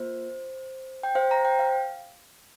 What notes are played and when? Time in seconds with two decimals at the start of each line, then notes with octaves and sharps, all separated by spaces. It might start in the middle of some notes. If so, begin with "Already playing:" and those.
Already playing: A#3 F4 C5
1.03 G5
1.15 C5 F5
1.31 A#5
1.45 G5
1.59 F5